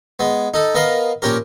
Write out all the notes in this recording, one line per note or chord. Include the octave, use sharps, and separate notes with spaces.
G#3 B3
D#4 A4
B3 A#4 D#5 F5
A#1 C#4 G4 A#4